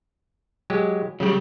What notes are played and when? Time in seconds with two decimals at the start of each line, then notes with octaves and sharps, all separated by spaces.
0.70 F#3 G#3 G4
1.20 C#3 F#3 G3